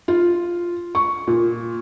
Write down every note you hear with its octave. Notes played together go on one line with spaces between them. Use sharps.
F4
C#6
A#2